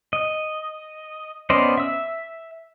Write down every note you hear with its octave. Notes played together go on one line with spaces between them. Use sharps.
D#5
B3 C#4 C5 D5 D#5
E5 E6